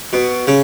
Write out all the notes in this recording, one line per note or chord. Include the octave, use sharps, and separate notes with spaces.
B2
C#3